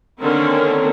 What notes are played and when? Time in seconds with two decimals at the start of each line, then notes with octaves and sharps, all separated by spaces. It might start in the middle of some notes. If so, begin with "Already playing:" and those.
0.21 D3 D#3 A#3 C4 C#4 A#4